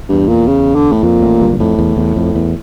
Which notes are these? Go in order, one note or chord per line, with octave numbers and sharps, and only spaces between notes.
E2 G2
A#2
C#3
D3
A2
F2 A#2
A1 A2
G1 G2
G2
F2 A2
E2
E2
F2
E2